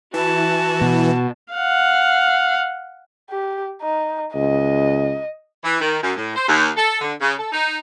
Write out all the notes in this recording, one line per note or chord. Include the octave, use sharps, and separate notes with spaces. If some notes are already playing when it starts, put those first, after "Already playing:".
E3 F#4 A5
B2
F5 F#5
G4
D#4
C#2 D#5
E3
D#3
F#2
A2
C5
D#2
A4
D3
C#3
A4
D#4